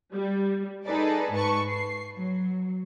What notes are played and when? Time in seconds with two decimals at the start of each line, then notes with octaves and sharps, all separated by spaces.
0.12 G3
0.85 D#4 G#4 A4 B4 D5
1.33 G#2 B4 A5 C#6 C#7
1.70 C7
2.15 F#3